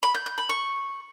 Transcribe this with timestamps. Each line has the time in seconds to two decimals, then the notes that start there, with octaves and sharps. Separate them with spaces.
0.03 B5
0.14 G6
0.26 G6
0.38 B5
0.49 C#6